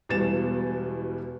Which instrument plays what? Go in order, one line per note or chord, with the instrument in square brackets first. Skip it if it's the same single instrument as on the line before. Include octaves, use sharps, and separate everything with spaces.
[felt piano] E1 E2 B2 G3 A6 E7